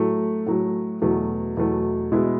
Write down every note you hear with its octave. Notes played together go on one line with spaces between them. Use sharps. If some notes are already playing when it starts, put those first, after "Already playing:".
Already playing: A2 F#3 A3
A2 F#3 A3
E2 B2 F#3 A3
E2 B2 F#3 A3
B2 G#3 B3 E4